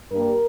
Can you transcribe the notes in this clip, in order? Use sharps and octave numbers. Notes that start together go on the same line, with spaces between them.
G2 G3 A#3 A#4